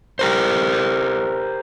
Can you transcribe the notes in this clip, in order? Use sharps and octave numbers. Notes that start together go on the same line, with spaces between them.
G4 A#4 C5